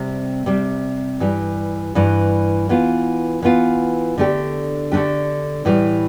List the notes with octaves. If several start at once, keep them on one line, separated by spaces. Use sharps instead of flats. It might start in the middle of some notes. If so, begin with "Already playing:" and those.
Already playing: C3 G3 C4
C3 G3 C4
G2 E3 G3
G2 E3 G3
E3 B3 F4
E3 B3 F4
D3 A3 D4 G4
D3 A3 D4 G4
A2 E3 G3